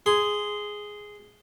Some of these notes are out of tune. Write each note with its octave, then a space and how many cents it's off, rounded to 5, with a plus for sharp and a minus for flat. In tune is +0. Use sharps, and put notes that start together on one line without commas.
G#4 +0 C6 -15